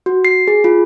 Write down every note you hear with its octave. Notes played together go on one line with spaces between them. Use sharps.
F#4
C7
G#4
F4